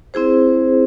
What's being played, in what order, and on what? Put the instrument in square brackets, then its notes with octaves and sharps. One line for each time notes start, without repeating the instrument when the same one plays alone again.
[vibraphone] C4 E4 G#4 C5